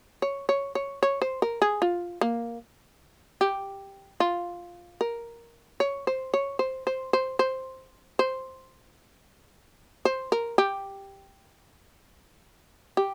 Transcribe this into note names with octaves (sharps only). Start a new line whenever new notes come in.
C#5
C#5
C#5
C#5
C5
A#4
G#4
F4
A#3
G4
F4
A#4
C#5
C5
C#5
C5
C5
C5
C5
C5
C5
A#4
G4
G4